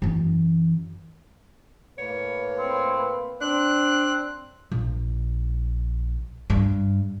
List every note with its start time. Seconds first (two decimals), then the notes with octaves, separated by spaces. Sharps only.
0.02 F#2 E3
1.99 A2 A#3 B4 C#5
2.58 C4
3.41 C4 D4 F#6
4.72 A#1
6.50 G2